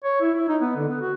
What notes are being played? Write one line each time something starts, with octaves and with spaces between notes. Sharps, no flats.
C#5
E4
E4
D#4
B3
D3
B3
F#4